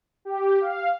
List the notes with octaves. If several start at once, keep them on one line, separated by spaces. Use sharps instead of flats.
G4
F5